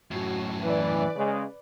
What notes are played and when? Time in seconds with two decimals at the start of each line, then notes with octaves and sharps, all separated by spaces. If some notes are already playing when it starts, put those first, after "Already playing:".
0.11 F#2 A2 F#4
0.63 E3 B4 D5
1.16 C#3 G#3